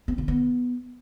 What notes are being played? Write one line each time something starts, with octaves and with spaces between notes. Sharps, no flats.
C4
D3
B3